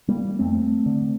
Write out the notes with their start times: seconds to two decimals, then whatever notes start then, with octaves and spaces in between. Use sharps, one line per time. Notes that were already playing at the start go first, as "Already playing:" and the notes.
0.08 G3 A#3
0.39 F2 A3 C4
0.86 D3